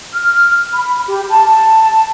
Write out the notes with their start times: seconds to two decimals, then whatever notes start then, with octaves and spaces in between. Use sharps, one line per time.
0.13 F6
0.74 B5
1.06 G4
1.30 A5